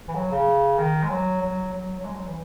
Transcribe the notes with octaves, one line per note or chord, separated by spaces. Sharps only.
E3
F#3
C#3
D#3
G#3
F#3
F#3
F#3
F#3
G#3
F#3
E3